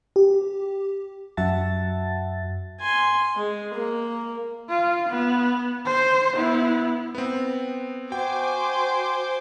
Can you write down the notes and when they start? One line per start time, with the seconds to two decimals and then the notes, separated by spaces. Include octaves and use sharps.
0.16 G4
1.37 F#2 F#4 E5 F#5 A5 A6
2.80 G#5 C6
3.36 G#3
3.74 A#3
4.69 F4
5.10 B3
5.85 C5
6.36 B3 E4
7.15 B3 C4
8.12 F#4 C5 G5 G#5 D6